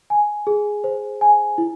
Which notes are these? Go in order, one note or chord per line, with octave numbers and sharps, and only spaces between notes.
G#5
G#4
C5
G#5
E4